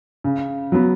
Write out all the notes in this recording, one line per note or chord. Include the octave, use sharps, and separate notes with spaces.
C#3
F#3 B3